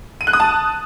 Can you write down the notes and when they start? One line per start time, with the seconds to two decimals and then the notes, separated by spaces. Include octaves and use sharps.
0.21 D#7
0.27 F#6
0.33 D#6
0.40 A5